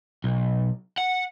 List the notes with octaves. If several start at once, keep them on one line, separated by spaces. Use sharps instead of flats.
B1
F#5